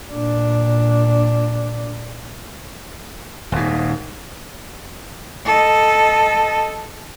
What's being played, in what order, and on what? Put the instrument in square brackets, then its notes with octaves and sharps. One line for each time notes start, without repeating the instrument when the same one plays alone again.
[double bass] A#2 D4
[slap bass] D#1 G#2
[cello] A4 D#5